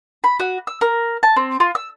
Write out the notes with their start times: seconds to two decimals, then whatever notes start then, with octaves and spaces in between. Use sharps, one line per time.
0.24 B5
0.40 F#4
0.67 E6
0.81 A#4
1.23 A5
1.36 C4
1.60 F4
1.75 E6